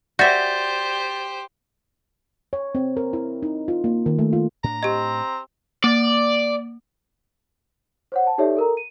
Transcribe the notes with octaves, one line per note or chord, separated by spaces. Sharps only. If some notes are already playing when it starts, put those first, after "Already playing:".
F#4 G4 C5 D5 E5 G6 A6
C#5
C4
A#4
E4
D#4
F4
A#3
D#3
A3
F4
A2 D4 A#5
C4 G4 D#5
A#3 D5
C5 C#5 F#5
A5
D#4 G4 A4 C#5 D5 E5
A4 A#4 A#5
D#7